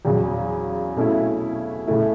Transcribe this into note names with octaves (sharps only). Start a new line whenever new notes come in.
E2 C#3 F#3
B2 A3 C#4 E4
C#3 A3 E4